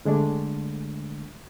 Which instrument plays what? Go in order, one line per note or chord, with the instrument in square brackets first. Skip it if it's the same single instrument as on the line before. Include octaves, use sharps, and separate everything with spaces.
[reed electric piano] D3 G#3 A3 D4